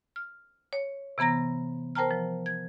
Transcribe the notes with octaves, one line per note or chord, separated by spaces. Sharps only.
F6
C#5
C3 E3 B3 A#5 A#6
A#4 C5 G5 A5 A#5 F6
F3
G#6